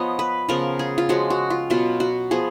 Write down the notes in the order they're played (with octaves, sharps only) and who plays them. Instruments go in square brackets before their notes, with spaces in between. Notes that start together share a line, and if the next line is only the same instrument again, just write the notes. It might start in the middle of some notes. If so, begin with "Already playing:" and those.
Already playing: [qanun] F3 B3 C#5 D#5
B4
C#3 F3 B3 A#4
G#4
F4
F3 G#3 C#4 F#4
F#4
F4
B2 F#3 B3 F4
F#4
F3 B3 G#4